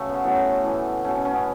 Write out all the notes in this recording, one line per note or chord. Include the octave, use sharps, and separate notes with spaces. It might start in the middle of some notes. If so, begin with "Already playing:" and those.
Already playing: C#3 F#3 A3 A4 B4
B3 C#4
A2 F#3 A3 B3
A2 E3 A3
B2 A3 C#4
C#4
C#4
B3